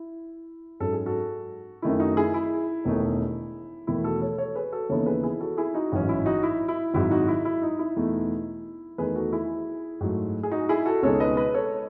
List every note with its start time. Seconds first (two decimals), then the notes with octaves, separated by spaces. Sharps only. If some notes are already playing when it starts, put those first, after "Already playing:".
Already playing: E4
0.80 G#2 F#3 C#4 A4
0.93 G#4
1.06 F#4 A4
1.82 F#2 D#3 A3 D#4 E4
2.00 D#4 F#4
2.17 E4 G#4
2.34 E4
2.85 E1 E2 D#3 A3 D#4
3.87 E1 E2 D#3 A3 E4
4.04 F#4 A4
4.21 A4 C#5
4.38 A4 C#5
4.56 G#4 B4
4.72 F#4 A4
4.89 D#2 C#3 E3 B3 D#4 A4 C#5
5.06 G#4 B4
5.23 E4 G#4
5.41 F#4 A4
5.58 E4 G#4
5.74 D#4 F#4
5.92 A1 G#2 F#3 C#4
6.09 E4
6.26 D#4 F#4
6.43 E4
6.68 E4
6.94 G#1 G#2 F#3 E4
7.11 D#4 F#4
7.28 E4
7.45 E4
7.62 D#4
7.79 E4
7.96 E2 B2 A3 D#4
8.98 E2 D#3 A3 D#4 G#4 B4
9.15 F#4 A4
9.33 E4 G#4
10.01 G#2 F#3 A3
10.43 G#4
10.51 D#4 F#4
10.69 E4 G#4
10.86 F#4 A4
11.03 C#2 B2 G#3 D#4 A4 C#5
11.20 B4 D#5
11.37 B4 D#5
11.54 A4 C#5